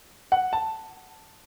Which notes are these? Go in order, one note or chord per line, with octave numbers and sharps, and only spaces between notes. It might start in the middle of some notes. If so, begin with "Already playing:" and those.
F#5
A5